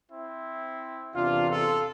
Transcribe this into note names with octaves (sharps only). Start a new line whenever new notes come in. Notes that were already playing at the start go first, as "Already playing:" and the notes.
C4 E4
E2 C3 E3 D4 F4
F4 A4